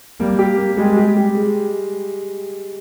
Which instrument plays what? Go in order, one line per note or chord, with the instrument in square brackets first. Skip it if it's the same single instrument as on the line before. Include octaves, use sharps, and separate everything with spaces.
[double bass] G3 [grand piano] A#3
[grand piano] G4
A#3
[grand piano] G3 [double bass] G#3
[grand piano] G4
G3
G#3